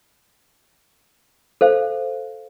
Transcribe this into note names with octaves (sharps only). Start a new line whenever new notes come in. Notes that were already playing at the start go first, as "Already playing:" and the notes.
A4 C5 F5